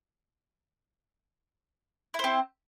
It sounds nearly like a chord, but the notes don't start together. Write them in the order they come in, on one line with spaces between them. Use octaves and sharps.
E4 C5 C4